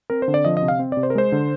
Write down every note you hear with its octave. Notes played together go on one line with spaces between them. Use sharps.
C4 A#4
C5
D3
D5
F3 D#5
D#5
C3
F5
C4
C3 D5
C5
A#4
G#3 C5
D3